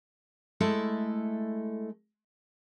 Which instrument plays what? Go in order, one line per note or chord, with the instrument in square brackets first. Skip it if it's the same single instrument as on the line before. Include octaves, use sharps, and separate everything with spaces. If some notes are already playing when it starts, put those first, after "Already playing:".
[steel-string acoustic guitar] G#3 A3 E4 A4 E5